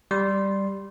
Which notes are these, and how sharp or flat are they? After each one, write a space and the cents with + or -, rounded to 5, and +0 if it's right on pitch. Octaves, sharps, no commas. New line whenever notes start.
G3 +0 C6 +0